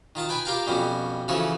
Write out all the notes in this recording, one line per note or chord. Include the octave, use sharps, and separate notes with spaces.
D#3 F4 A5 D#6
B4 G5 G#5 B5
F4 G4 A#4 F5 G5 A5
F2 B2 G3 C#4
C#3 E3 F3 F#4 A4 C#5